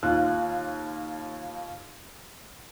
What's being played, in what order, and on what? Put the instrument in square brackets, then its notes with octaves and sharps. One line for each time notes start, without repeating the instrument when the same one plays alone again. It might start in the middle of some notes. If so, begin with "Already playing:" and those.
[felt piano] D#2 F4 F#6